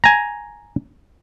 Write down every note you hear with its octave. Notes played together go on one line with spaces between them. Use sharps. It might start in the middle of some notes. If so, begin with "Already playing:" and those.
G#5 A#5